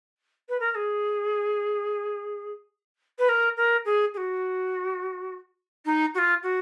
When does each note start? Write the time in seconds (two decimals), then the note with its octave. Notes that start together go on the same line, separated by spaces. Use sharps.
0.49 B4
0.60 A#4
0.71 A#4
0.75 G#4
3.18 B4
3.28 A#4
3.56 A#4
3.85 G#4
4.14 G#4
4.17 F#4
5.85 D#4
6.14 F#4
6.18 F4
6.43 F#4